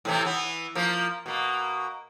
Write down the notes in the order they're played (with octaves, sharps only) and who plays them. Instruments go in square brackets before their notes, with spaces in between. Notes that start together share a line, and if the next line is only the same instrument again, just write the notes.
[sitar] A2 C3 E3
E3 B3
F3 A#3
B2 A#3